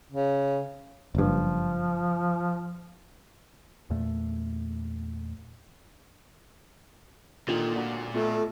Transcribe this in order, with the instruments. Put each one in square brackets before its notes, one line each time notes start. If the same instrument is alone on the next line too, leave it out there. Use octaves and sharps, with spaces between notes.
[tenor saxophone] C#3
[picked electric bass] F#1 G2 [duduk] F3
[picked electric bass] E2 A#2 A3
[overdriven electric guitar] A#2 [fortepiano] D3 D#3 G4 [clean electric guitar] F4
[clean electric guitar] D2 G#2 A#5 [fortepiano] D4 F#4
[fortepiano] B2 [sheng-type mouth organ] A3 [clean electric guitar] F4 A4